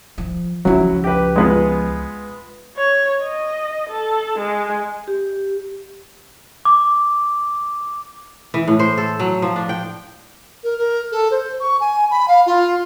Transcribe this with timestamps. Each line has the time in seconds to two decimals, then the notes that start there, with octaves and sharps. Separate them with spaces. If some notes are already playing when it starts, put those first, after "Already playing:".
0.18 F3
0.65 C#2 F3 F#3 E4
1.04 G4 B4
1.36 G#3 B3 F4
2.77 C#5
3.23 D#5
3.89 A4
4.38 G#3
5.08 G4
6.65 D6
8.54 E3
8.67 A2
8.79 C5
8.98 A4
9.20 F#3
9.42 F3
9.56 D4
9.69 G5
10.63 A#4
10.78 A#4
11.12 A4
11.31 C5
11.60 C#6
11.80 G#5
12.11 B5
12.28 F5
12.46 F4